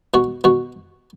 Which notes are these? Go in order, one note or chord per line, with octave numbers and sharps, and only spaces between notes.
B2 F#4
B2 F#4